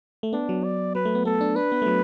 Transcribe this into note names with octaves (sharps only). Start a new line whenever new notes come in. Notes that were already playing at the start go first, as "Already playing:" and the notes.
A3
B3 D4
F#3
D5
F#3 B4
A3
B3
B3 A4
D4
D4 B4
B3
A3
F#3